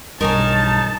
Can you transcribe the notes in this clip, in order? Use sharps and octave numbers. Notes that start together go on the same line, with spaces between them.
B1 G2 D#4 A#4 C#5 G#5 A5